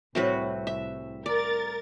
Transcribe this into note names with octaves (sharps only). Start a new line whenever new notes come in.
C2 A2 G3 A3 C4 F#4 B4
E5
A#4 D5 A6